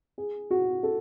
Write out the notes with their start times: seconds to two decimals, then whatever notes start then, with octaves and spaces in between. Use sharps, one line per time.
0.18 G#4
0.51 F#4
0.83 A4